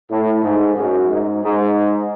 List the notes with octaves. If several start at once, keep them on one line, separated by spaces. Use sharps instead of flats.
A2
G#2
F#2
G#2
G#2